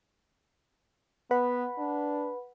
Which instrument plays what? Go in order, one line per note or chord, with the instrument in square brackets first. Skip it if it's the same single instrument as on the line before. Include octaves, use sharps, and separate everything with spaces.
[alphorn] B3 [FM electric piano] B4 F#5 B5
[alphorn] D4